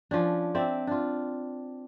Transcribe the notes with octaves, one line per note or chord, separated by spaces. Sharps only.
F3 C#4 D4
C4 D5 E5
D4 F4